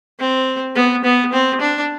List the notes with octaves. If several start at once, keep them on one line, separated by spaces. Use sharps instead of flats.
C4
B3
B3
C4
D4